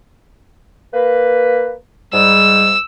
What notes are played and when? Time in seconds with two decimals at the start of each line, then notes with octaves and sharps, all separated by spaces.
0.94 A#3 B4
2.13 G#2 G3 E6